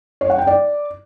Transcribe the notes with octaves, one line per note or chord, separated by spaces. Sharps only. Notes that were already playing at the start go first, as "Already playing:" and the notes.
C#5
F#5
G5
D5